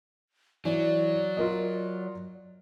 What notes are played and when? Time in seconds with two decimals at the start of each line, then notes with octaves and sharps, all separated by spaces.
0.65 E3 F#3 D5
1.37 F4 A#4 D#5